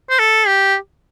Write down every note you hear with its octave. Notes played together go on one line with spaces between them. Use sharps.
C5
A4
G4